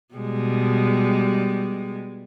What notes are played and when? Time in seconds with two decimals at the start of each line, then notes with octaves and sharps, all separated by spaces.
0.15 B2 G3 G#3